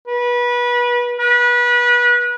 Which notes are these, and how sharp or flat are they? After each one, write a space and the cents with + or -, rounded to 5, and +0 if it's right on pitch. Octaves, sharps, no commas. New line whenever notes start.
B4 -25
B4 -30